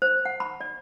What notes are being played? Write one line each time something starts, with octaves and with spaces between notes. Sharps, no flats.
C5
F#5
B5
D5